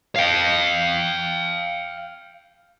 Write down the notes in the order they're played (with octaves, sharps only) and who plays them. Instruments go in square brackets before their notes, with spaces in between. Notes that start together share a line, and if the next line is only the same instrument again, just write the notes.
[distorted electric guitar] F5 G5